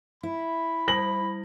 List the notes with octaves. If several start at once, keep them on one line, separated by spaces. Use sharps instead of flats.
E4 B5
G3 A#6 F#7